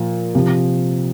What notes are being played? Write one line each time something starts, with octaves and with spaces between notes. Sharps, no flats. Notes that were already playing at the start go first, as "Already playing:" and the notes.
Already playing: A#2 F3
C3 F3